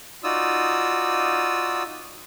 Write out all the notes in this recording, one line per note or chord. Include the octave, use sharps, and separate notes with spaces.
D#4 F4 F#4 D5 D#6 E6